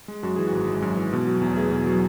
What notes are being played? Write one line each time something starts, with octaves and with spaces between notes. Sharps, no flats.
G#3
F#2 F#4
E3 G#4
G#1 F#4
G#3
F#2
E3
B2
F#3
E2
A3 G#4
B2
F#3